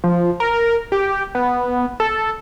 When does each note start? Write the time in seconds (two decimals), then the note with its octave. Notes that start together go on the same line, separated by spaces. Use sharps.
0.04 F3
0.40 A#4
0.92 G4
1.35 B3
2.00 A4